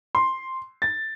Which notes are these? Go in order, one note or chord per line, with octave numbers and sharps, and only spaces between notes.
C6
A6